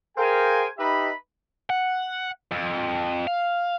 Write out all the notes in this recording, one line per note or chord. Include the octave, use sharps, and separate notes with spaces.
G#4 A#4 C5 F5 G5 G#5
D#4 G4 B4 D#5 E5 B5
F#5
F2
F5